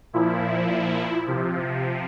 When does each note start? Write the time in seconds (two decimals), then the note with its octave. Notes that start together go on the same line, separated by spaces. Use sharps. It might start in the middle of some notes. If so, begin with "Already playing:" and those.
0.13 A#2 F3 E4
1.27 C3 F3